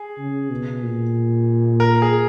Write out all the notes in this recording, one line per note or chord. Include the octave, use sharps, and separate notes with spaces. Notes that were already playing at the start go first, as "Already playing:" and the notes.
Already playing: G#4
C#3
B2
A#2
A#4
G#4